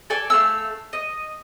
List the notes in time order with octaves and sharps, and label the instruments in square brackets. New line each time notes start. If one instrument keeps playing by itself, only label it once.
[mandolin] A4 D5 G#5
A3 F5 E6
D#5